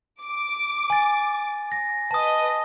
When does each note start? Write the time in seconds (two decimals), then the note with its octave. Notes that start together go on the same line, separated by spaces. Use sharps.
0.22 D6
0.90 G#5 A6
1.72 A#6
2.11 B4 D#5 A5 D#6